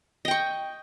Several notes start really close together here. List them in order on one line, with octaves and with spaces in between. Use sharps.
D#5 G5 C#6